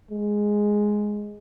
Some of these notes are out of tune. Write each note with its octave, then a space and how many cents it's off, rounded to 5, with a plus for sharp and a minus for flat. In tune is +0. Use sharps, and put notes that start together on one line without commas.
G#3 +0